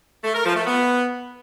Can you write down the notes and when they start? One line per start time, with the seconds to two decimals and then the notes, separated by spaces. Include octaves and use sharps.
0.24 A3
0.35 A#4
0.45 F3
0.56 A3
0.67 B3